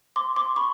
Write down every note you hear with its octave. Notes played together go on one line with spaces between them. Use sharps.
C6 D6
C6 D6
B5 C#6